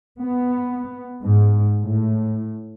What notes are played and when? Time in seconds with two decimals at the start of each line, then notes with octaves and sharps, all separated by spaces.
0.20 B3
1.23 G#2
1.81 A2